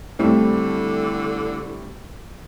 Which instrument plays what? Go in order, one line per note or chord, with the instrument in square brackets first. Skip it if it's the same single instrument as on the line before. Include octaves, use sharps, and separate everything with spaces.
[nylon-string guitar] A2 E4 [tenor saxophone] D3 [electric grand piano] G3 A3 C4